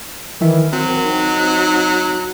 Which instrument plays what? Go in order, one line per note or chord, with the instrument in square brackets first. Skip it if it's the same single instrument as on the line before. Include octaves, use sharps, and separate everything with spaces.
[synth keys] D#3 E3 E4 [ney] A#4
[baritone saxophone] F#3 [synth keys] C4
[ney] D#4